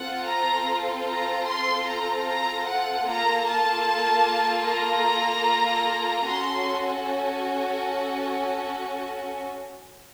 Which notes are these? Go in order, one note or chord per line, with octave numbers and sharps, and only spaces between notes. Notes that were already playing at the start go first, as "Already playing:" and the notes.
Already playing: C4 F4 A4 F#5
A#5
A#5
C6
A#5
A#5
F#5
A#3 F4 A4 A#5
A5
A#5
C#4 F#4 A4 C6